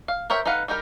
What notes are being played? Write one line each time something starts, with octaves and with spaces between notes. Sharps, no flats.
F5
A#4 C5 C#5 E5 G5
D#4 A4 B4 F5 F#5
G3 D#4 G4 A#4